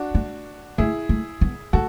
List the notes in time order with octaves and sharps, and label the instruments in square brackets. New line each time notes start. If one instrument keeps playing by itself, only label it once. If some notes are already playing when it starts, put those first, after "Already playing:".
Already playing: [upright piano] D4 F#4
[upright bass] A3
[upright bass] A3 [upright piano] E4 G#4
[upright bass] A3
B3
[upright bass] A3 [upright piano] F#4 A4